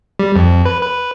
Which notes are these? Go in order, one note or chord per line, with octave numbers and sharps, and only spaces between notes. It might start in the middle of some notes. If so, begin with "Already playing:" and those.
G3
F2
B4
B4